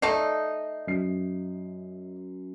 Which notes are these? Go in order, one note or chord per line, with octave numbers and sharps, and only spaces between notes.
A3 D#4 D5 C7
F#2 C7